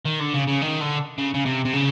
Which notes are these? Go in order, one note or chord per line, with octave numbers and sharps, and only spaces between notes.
D#3
D3
C#3
C#3
D#3
D3
C#3
C#3
C3
C3
C#3